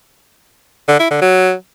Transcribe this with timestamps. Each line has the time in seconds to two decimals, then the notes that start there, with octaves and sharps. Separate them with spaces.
0.88 D3
1.00 E4
1.11 D3
1.22 F#3